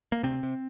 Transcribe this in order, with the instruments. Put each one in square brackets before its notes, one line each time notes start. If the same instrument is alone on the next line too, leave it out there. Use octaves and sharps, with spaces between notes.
[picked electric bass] A#3
D2 C3 C4
C3